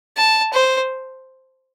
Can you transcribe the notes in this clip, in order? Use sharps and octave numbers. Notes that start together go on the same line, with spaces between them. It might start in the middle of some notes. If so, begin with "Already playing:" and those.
A5
C5